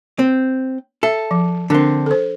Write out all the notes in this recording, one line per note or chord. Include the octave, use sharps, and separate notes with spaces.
C4
A4 E5
F3
D3 C4 D4 A#4
A4 C5